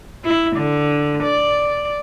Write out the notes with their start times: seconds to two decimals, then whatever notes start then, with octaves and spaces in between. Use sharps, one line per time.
0.25 E4
0.56 D3
1.24 D5